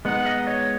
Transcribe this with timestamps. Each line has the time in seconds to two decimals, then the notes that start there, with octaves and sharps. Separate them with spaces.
0.05 G#3 B3 D#4 F#5
0.26 D#5
0.47 C#5